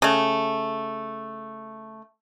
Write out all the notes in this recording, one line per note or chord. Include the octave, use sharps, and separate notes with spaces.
C#3 A3